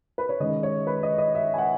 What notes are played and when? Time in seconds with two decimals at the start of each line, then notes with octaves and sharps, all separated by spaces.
0.18 B4
0.29 C#5
0.40 D#3 G#3 C#4 D#5
0.63 C#5
0.87 B4
1.03 D#5
1.18 D#5
1.35 E5
1.54 G#5
1.58 F#5